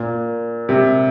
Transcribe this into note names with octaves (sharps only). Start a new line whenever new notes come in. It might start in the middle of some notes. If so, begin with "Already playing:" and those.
Already playing: A#2
C3